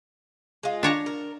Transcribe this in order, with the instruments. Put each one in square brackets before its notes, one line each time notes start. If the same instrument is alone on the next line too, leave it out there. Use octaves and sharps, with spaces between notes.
[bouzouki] G#3 F4
[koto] D4 C#5 A#5
[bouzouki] A#4